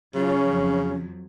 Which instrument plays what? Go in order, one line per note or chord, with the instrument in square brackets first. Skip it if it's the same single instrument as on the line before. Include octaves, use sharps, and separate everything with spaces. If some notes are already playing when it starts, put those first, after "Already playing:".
[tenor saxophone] C#3 [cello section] F#3 F4 [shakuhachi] C#4
[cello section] F2 F3 F#3